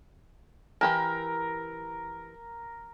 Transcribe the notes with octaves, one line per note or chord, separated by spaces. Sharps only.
E3 G4 A#4 A5